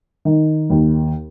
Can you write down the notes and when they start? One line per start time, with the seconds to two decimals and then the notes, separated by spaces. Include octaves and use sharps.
0.25 D#3
0.70 D#2